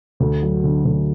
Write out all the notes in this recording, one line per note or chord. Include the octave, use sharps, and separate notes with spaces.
D2
F#3
D3
D2